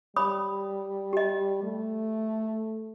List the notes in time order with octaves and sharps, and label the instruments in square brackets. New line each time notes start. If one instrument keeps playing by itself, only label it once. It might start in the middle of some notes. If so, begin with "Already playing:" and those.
[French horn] G3 [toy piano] C#5 B5 D#6
[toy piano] G4 D#5
[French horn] A3